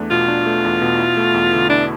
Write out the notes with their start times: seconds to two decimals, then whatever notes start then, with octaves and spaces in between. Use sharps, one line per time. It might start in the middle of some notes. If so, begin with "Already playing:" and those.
Already playing: E2 A3 D4
0.11 B2 F4
0.28 D4
0.46 A3
0.65 E2
0.82 B2
0.99 E4
1.17 A3
1.34 E2
1.53 D3
1.70 D4 E4